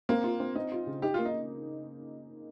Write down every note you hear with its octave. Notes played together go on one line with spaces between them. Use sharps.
A#3 C4
F4
C4
C4 D#4
F4
C#3
D#4 G4
A#3 F4
D#4